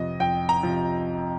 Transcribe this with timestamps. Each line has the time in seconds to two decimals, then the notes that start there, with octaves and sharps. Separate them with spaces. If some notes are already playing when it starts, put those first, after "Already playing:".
Already playing: F2 C3 F3 D#5
0.20 F2 G5
0.49 A#5
0.63 C3 F3